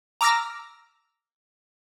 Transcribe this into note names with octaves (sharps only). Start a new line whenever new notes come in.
A#5 D6 E6 F6 A#6